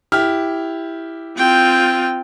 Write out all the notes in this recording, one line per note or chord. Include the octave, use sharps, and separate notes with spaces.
E4 G4 F6
C4 F4 G5